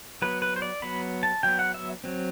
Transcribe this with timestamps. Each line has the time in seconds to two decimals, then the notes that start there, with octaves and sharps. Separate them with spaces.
0.22 F#3 B3 B4
0.42 B4
0.56 C5
0.62 D5
0.82 F#3 B3 B5
1.23 A5
1.43 F#3 B3 G5
1.59 F#5
1.74 E5
2.04 F#3 C4